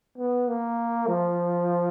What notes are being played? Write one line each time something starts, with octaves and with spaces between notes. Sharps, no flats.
B3
A#3
F3